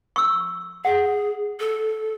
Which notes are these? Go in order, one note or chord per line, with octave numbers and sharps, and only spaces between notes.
C#6 E6
G#4 F#5
A4